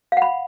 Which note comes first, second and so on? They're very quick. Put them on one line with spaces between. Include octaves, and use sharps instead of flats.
F5 F#5 B5